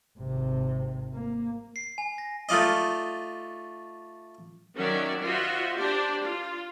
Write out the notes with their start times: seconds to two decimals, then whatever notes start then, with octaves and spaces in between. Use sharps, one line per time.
0.19 G#1 C3
1.13 A#3
1.76 C7
1.98 G#5
2.18 A#6
2.49 A3 D#4 F4 D5 D#5
4.76 D#3 F#3 C#4 D5 E5
5.23 F4 F#4 C5 D#5 E5
5.75 D4 G4 C5 D5
6.22 F4